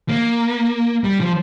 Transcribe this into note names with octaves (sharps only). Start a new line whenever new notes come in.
A#3
G3
F3